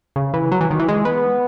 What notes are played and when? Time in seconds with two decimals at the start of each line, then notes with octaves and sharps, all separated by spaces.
0.16 C#3
0.34 E3
0.51 F#3
0.61 E3
0.71 D#3
0.79 E3
0.88 G#3
1.05 B3